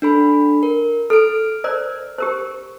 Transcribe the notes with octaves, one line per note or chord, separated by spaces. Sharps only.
D4 A4 B5
A#4
A4 F6 D7
A#4 C5 D5
G4 A#4 C5